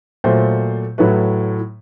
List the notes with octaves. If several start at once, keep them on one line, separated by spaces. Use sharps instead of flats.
A#2 F#3 A3 C5
A2 F#3 A3 B4